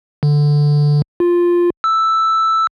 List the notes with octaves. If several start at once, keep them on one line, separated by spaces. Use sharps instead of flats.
D3
F4
E6